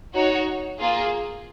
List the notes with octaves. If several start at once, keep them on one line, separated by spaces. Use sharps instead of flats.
D#4 F#4 C#5
A#3 F4 G#4